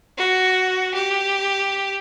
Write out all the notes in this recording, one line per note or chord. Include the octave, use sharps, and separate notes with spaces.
F#4
G4